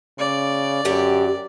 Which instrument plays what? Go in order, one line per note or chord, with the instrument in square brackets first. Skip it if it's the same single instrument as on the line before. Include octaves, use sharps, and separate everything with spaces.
[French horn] C#3 [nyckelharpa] D5
[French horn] F#2 [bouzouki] D3 G4